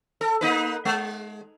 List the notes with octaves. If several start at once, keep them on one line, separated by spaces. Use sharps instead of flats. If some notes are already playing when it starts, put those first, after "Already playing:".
A4
A#3 D#4 B4
G#3